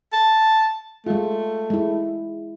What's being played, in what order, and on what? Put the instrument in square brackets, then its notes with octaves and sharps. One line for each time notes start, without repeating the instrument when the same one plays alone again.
[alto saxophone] A5
[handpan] G#3 F4 [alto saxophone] A3
[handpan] G#3 E4